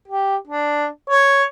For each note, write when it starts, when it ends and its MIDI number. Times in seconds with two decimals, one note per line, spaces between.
0.08 0.36 67
0.47 0.86 62
1.10 1.44 73